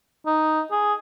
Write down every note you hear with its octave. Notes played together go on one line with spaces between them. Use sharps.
D#4
G#4